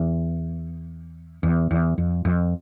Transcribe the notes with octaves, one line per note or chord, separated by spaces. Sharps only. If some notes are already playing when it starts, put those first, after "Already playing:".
Already playing: E2
E2
E2
F2
F2